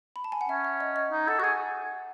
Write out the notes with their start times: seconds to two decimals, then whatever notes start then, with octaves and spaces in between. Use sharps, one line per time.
0.16 B5
0.24 A5
0.32 G#5
0.41 F#5
0.49 C#4 E5
0.64 E5
0.80 D#5
0.96 D#5
1.11 D#4
1.28 A4 F#5
1.39 F#4 F#5
1.43 G#4 G#5